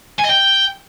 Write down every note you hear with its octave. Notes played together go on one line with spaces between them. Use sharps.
G#5
D#5
G5